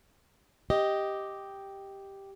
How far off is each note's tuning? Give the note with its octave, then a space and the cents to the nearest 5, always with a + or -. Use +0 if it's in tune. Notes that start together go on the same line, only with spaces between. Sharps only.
G4 +0 D#5 +5